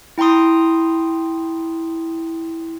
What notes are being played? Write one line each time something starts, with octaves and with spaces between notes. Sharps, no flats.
E4 G5 A#5 C6 D#6